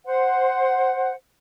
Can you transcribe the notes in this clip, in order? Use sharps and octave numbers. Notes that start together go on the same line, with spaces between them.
C5 F#5